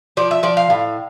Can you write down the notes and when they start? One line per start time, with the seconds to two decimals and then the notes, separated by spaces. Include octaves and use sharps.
0.17 F3 D5
0.31 E5
0.43 F3 D5
0.57 F5
0.70 A2